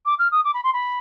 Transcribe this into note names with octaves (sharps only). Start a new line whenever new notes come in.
D6
F6
D#6
D6
B5
C6
B5